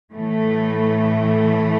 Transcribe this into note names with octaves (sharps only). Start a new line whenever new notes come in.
A2 E3 A3